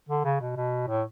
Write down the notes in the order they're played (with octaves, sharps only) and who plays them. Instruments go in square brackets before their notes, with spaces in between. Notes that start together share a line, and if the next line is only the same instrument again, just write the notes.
[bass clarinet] D3
C#3
B2
B2
A2